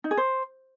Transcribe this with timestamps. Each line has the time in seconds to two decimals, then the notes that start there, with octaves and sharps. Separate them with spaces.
0.04 D#4
0.11 G#4
0.17 C5